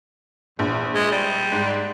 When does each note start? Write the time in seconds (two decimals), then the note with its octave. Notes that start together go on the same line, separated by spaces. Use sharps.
0.59 A#1 E2
0.95 G#3
1.12 G3
1.52 G#2